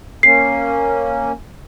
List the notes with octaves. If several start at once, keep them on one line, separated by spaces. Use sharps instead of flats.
A#3 C#4 C7